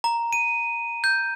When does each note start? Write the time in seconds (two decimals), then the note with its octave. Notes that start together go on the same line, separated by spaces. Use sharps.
0.04 A#5
0.33 D#7
1.04 G6